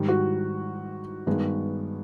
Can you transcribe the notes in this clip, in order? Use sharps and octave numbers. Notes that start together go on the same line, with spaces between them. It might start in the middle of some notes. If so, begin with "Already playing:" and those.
Already playing: G#2 D#3 G3
F#4
G2 D#3 G#3 B3